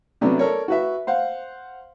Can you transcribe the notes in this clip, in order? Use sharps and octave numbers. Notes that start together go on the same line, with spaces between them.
C3 F#3 A3 B3 C#4 D4
A4 A#4 C#5 D5
F#4 B4 E5
C5 F5 F#5